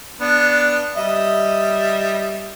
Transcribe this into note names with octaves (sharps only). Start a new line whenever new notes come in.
B3 D4
G3 D#5 E5